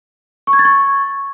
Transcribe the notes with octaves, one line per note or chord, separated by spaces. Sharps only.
C#6
G#6
A6
C#6